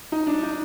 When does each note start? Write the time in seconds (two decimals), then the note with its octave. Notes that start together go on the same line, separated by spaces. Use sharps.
0.12 D#4
0.27 D4
0.43 D#4